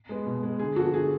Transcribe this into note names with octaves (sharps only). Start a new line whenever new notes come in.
G#3 B3
B2
G#3 B3
D3 G#4
F3 B3 F#4 A4
D3 G#4